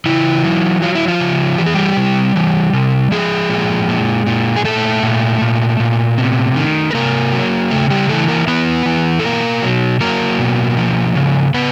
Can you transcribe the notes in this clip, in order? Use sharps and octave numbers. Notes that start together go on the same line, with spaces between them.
C#3 E3 E4
F#3
F#3 F4
E4
F3 F4
C#3
E3 G4
G#4
G3 G4
C3
E3
C3
F3 G#3 G#4
A#2
A#2
A#2
G#4
A#2 A3 A4
A#2
A#2
A#2
C3
D#3
B4
C3 A#3 A#4
F#3
C#3 A3 A4
G3 G4
E3 A3 A4
A#3 A#4
E3 B3 B4
E3
A4
B2 A#3 A#4
F#3
F#3 A#3 A#4
B2
F3
C#3
C#3 B3 B4